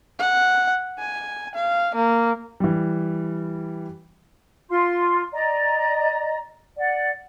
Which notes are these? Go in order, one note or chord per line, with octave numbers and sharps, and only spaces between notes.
F#5
G#5
F5
A#3
E3 G3
F4 C6
D5 D#5 A#5
D5 F#5